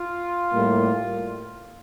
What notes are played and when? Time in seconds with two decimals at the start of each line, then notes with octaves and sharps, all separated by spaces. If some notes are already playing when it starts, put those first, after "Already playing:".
Already playing: F4
0.53 A2 G3 A#3